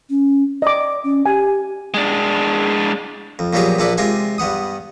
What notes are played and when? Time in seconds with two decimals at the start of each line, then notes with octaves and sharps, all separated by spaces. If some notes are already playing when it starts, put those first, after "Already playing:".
0.10 C#4
0.62 D5 D#5 D6
1.04 C#4
1.26 G4 G#5
1.94 G#3 D4
3.39 F2
3.53 A#2 F3 F#3 B3 G4 G#4
3.78 A#1 A#2 D4 A4 B4 D5
3.98 C3 G#3 F4 G#5
4.38 G2 B3 F#5 D#6